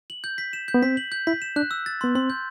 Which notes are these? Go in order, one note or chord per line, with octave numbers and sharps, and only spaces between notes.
F#7
G6
B6
E7
G6
B3
C4 B6
F#7
G6
E4 B6
E7
D4 F#6
E6
A6
B3 C6
C4 C6
G6